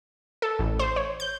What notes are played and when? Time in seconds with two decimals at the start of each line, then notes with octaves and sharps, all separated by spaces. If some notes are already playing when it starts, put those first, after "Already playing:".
0.42 A4
0.59 A1
0.79 C5
0.96 C#5
1.20 G6